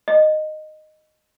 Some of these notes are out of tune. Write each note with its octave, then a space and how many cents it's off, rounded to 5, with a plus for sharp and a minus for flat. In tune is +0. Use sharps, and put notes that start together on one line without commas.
D#5 -10